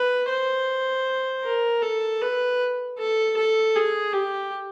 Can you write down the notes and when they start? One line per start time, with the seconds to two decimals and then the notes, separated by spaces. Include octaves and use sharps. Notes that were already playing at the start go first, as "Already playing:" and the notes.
Already playing: B4
0.29 C5
1.44 A#4
1.82 A4
2.21 B4
2.98 A4
3.37 A4
3.76 G#4
4.13 G4